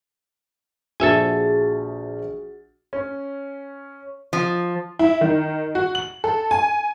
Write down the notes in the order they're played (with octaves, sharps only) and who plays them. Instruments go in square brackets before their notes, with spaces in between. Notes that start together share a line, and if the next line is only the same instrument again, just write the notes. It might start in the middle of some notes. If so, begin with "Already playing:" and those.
[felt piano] A#1 C5 A6 [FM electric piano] F#4 G#4 [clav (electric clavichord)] A4 E5 G#5
[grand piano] C#4
[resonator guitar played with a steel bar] F3
[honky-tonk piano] E4
D#3
F#4
F#7
A4
G#5